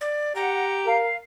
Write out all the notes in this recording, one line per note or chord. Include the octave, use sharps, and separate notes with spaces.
D5
G4 F#5 A#5
A#4 F5